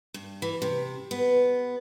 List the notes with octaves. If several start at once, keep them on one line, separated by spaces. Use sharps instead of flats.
G2
E3
C3
B3